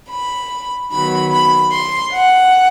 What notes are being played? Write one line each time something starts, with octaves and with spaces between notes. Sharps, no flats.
B5
D#3 F#3 B3 B5
B5
C6
F#5